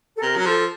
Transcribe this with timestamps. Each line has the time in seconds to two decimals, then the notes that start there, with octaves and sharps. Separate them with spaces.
0.16 A4
0.22 C3 A#4
0.37 F#3
0.46 F3 A4